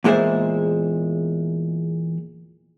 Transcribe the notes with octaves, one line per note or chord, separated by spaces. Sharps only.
E2 A#2 G#3 C#4 C5 E5